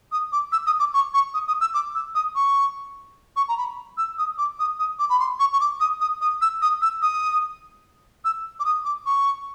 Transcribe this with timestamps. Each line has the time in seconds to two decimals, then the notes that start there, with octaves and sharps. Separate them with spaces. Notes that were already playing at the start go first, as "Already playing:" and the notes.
0.12 D#6
0.32 D6
0.52 E6
0.66 D#6
0.80 D6
0.94 C#6
1.14 C#6
1.34 D#6
1.48 D#6
1.61 E6
1.74 D6
1.95 E6
2.15 D#6
2.35 C#6
3.36 C#6
3.49 A#5
3.57 B5
3.98 E6
4.18 D#6
4.38 D6
4.59 D#6
4.79 D#6
4.99 D6
5.10 B5
5.20 C6
5.39 C#6
5.53 C#6
5.60 D6
5.80 D#6
6.00 D#6
6.21 D#6
6.41 E6
6.62 D#6
6.82 E6
7.02 D#6
8.25 E6
8.60 D6
8.65 D#6
8.85 D6
9.06 C#6